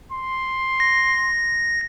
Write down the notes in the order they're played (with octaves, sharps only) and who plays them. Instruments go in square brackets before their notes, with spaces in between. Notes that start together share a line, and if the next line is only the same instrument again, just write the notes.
[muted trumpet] C6
[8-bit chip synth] A#6